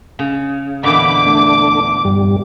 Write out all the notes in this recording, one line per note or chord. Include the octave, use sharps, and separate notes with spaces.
C#3
E2 A#2 D3 B5 D6
A3 D4
G2 G3